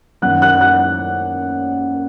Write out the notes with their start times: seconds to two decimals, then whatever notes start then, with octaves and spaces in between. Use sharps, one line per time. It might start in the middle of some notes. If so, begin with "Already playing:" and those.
0.22 F#2 D#3 F#5 F#6
0.42 F#5 F#6
0.61 F#5 F#6